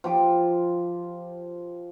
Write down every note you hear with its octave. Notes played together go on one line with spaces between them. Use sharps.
F3 G4 D6